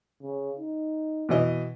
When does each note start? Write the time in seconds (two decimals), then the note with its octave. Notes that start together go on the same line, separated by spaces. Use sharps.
0.23 C#3
0.59 D#4
1.29 B2 E3 D#5